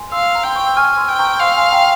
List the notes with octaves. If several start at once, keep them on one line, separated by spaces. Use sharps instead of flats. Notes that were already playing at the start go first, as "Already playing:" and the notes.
Already playing: G#5 C6
F5 C6 E6
A#5
G5 C6
C#6
E6
G#5 C#6 F6
C6 E6
G5
A#5 C#6
F5 C6 E6
G#5 C6
G5 A#5